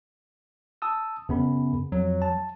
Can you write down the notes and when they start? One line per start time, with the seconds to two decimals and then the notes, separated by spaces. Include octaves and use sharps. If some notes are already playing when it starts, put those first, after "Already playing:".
0.82 A5 D#6 E6
1.29 F#2 C#3 B3 B5
1.92 F2 F#3
2.22 A5